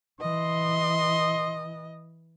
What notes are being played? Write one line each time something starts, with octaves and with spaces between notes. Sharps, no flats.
E3 D#5 C6